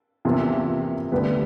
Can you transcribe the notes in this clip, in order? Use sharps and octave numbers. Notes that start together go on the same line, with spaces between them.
E2 C3 F3 A#3
D2 D3 G3 B3